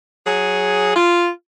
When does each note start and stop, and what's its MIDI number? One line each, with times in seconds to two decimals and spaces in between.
0.26 0.95 54
0.26 0.95 68
0.96 1.29 65